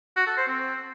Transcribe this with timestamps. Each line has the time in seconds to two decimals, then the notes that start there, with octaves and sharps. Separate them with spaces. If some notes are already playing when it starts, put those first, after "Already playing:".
0.16 F#4
0.27 A4
0.37 C5
0.47 C4